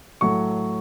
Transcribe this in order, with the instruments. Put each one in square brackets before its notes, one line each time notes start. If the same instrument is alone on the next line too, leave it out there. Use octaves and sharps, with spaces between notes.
[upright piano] A2 F#3 A3 C#6